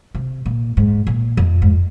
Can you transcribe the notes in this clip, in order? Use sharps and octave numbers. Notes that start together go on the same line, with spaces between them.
C3
A#2
G#2
A#2
F2
G#2